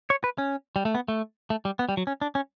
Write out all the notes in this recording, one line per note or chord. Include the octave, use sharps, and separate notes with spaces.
C#5
B4
C#4
G3
A3
B3
A3
A3
G3
B3
G3
F#3
C#4
D4
C#4